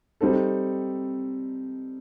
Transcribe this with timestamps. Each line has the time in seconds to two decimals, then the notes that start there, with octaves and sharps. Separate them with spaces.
0.21 G3 C4 D#4 A4